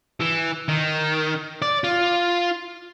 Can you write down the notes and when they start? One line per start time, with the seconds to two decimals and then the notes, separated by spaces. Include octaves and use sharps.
0.20 E3
0.68 D#3
1.62 D5
1.84 F4